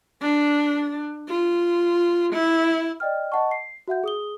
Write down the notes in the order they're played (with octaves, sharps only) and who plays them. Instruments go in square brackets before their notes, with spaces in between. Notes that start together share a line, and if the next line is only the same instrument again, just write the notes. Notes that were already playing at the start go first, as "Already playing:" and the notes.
[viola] D4
F4
E4
[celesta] D5 D#5 G5 F6
D#5 F#5 A5 C#6
C7
F#4 E5 F#5 G6
G#4 D#6 G7